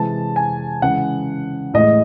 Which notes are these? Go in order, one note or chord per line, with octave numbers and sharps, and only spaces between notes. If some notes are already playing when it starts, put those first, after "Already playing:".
Already playing: C3 E3 G#3 A5
G#5
C#3 E3 G#3 F#5
A2 E3 G#3 D#5